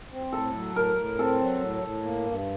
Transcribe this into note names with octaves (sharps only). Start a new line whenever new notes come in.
C4
A2 A4
F#3
A2 A#4
A2
C4 A4
F#3
A2
A2
A#3
G2